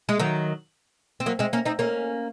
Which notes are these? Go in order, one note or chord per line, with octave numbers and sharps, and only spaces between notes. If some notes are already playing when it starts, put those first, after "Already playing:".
G#3
D#3 F#3
C4
F#3 A#3
G#3 C4
A#3 C#4
C4 D#4
A#3 C#4